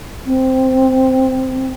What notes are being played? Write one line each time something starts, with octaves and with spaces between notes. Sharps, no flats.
C4